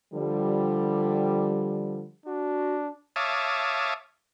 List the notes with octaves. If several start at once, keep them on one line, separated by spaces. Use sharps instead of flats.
D3 F3 G3
D4 F#4
C#5 E5 F5 A5 D6 D#6